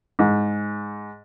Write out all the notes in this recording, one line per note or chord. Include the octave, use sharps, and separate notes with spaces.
G#2